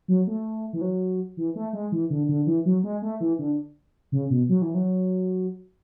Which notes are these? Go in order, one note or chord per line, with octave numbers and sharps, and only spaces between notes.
F#3
A3
E3
F#3
E3
A3
G#3
E3
D3
D3
E3
F#3
G#3
A3
E3
D3
C#3
B2
F#3
E3
F#3